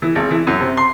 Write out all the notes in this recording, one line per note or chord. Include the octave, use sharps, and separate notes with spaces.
E3
G#1
E3
F#2
C3
C6